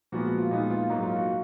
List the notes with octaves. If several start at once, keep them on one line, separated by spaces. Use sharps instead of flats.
A#2 F3 G#3 B3 F#4
F#4
F4
A#2 G#3 B3 D#4
F4
G#2 F#3 A#3 D#4
F4
F#4